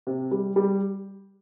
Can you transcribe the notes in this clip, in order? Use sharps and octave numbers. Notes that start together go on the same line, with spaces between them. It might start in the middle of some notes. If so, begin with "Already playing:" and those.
C3
G3
G3